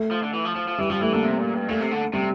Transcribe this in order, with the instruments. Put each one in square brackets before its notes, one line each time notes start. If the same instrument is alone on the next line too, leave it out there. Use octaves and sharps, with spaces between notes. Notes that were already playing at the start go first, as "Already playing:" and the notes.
Already playing: [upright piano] A3
[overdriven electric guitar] F3
D3
E3
F3
F3
F3
[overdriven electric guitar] E3 [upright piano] G3
[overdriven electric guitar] F3 [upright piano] G3
[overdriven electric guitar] E3 [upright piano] A3
[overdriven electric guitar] D3 [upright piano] A#3
[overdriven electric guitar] C3
A#2
G2
[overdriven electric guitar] A#2 [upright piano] A3
[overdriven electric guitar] C3
D3
[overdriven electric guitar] C3 [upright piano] G3